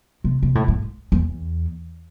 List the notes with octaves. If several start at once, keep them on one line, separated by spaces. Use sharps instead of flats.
C3
C3
A2
G#2
E2